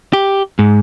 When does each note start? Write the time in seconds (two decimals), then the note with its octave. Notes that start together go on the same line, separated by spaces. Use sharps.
0.13 G4
0.59 G#2